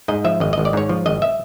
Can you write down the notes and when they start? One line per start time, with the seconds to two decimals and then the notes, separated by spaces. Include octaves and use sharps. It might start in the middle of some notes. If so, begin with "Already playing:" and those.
0.08 G#2 D#5
0.24 F3 E5
0.40 G#1 D#5
0.53 G#1 D#5
0.65 D5
0.73 G#2 C#5
0.89 F3
1.06 G#1 D#5
1.22 E5